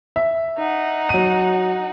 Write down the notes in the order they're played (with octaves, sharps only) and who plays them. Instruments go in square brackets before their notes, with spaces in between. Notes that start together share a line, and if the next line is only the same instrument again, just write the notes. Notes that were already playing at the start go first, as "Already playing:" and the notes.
[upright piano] E5
[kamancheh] D#4 F#5
[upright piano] F#3 D#7